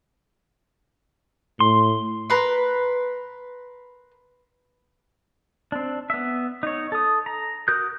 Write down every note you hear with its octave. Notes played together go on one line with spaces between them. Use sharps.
A2 C6
A#4 B4 C6
C4 D4
B3 E5
D#4 C#5
A4 D#6
A#5
F#4 A#4 D#6 F#6 G6